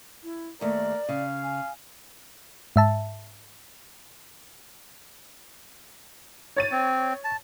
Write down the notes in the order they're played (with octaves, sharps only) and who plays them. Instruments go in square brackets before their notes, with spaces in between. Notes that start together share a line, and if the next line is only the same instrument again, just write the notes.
[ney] E4
[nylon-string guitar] D#2 A3 [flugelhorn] A#4 [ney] D5
[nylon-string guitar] C#3 [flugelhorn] F5
[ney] G#5
[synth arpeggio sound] G#2 E5 A5
[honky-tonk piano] C#5 A6 D#7
[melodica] C4
A5